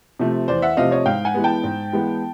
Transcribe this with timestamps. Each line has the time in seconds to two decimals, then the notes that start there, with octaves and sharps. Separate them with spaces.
0.19 C3 F3 A3 C4
0.48 E2 C5 D5
0.62 E5 F#5
0.77 C3 F3 A3 C4 D#5 F5
0.91 C#5 D#5
1.06 G#2 F5 G5
1.25 F#5 G#5
1.34 E3 G#3 B3
1.44 G5 A5
1.64 G#2
1.92 E3 G#3 B3